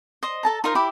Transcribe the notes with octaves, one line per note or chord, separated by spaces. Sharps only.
C5 D#5
A4 A5 A#5
D#4 F4 A#4 C5
E4 G4 B5 D6